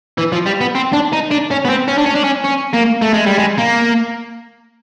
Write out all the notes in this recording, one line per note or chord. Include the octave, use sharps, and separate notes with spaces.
E3
F3
G3
B3
C4
D4
D#4
D4
C#4
B3
C4
C#4
D4
C#4
D4
C#4
C#4
A#3
A3
G#3
G3
G#3
A#3